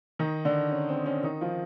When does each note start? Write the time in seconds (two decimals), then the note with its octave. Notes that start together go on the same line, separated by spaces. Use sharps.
0.19 D#3 D#4
0.45 D3 D4
0.72 C#4
0.89 C4
1.06 C#4
1.23 D#3 D#4
1.41 F3 F4